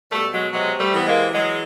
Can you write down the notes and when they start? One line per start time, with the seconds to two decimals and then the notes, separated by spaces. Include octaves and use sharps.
0.12 B2 G3 A3
0.32 F#3 G#3
0.52 C3 F#3 G#3
0.79 G3 A3
0.93 E3 B3
1.07 G#3 A#3
1.34 E3 F#3 G#3